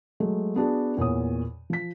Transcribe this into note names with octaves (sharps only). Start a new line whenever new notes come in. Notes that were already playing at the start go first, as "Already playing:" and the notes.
F#3 G#3 A3
B3 D4 F#4 G#4
E2 A#2 C#5 D#6
F3 B6